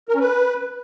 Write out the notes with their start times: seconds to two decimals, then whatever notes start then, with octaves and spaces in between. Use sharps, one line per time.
0.09 A#4
0.14 C#4
0.20 B4